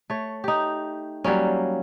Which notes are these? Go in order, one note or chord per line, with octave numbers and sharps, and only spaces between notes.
A3 C#5
D#4 G4
F#3 G3 A#3 C#4